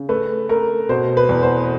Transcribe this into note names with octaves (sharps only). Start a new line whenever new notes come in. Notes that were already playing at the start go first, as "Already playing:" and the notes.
Already playing: C#3
A3 B4
A3 A#4
B2 C5
B4
E2
C5